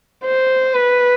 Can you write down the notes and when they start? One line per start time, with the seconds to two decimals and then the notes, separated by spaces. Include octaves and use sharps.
0.25 C5
0.75 B4